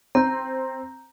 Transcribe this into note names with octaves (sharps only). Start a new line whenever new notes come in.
C4 A#5 G6